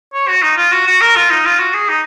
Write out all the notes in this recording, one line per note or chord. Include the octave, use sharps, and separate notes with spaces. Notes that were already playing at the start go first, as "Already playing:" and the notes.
C#5
F#4
D#4
F4
F#4
F#4
A#4
F4
D#4
F4
F#4
G#4
D#4